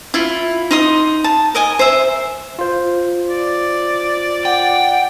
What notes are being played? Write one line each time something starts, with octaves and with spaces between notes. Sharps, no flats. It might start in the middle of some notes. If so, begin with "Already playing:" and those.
E4 F4
D#4 C6 D#6
A5
A#4 D#5 G#5
C5 E5
F4 C5
D5
F#5 G5